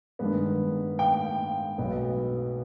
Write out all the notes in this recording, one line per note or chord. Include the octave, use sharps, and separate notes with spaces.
G2 D#3 G#3 B3
G5
B1 B2 B3